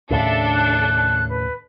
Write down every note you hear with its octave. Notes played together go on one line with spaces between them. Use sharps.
D#2 A2 C#3 D4 A4 E5
F#6
B4